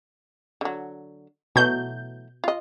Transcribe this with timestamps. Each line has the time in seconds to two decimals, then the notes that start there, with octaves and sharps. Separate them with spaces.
0.61 D3 F#3
1.56 B2 E3 F#3 A3 G6
2.44 F4 D#5